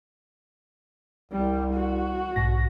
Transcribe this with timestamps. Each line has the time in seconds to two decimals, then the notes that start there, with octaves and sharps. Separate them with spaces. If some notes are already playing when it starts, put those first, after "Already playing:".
1.32 C2 G3
1.74 F#4
2.36 B1 G#2 A#6